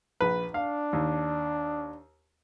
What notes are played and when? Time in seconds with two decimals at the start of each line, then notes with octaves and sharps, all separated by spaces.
0.21 A#1 B4
0.54 D4 F5
0.93 D#2